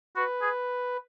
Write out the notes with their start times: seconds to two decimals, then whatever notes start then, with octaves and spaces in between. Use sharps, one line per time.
0.16 F#4 B4
0.42 G#4